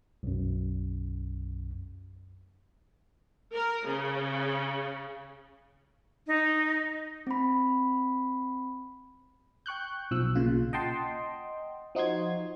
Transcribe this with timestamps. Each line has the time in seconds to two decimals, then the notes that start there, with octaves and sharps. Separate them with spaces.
0.23 B1 F#2
3.54 A#4
3.87 C#3
6.27 D#4
7.27 C4 B5
9.66 G5 C#6 F#6 G6
10.11 B1 F3 E6 F#6
10.35 B1 A#2 C#3 F4
10.73 D#5 F#5 G5 A5 C6
11.95 F3 D#4 F#4 C6 G#6